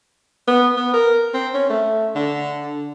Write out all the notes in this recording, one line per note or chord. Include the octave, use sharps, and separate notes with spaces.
B3
B3
A#4
C4
C#4
A3
D3